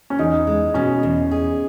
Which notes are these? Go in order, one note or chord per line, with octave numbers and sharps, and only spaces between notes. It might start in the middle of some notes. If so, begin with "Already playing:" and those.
C#4
E2 D#4
G#3
B2 C#4
E2
G#4